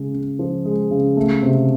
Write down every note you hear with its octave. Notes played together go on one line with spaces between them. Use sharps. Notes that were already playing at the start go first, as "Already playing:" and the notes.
Already playing: C#3 G#3
C#3
F3
G#3
C#3
A3
C3